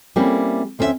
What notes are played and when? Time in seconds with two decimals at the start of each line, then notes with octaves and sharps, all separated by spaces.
0.16 G3 A#3 C4 C#4 E4
0.79 D2 C4 C#4 E4 E5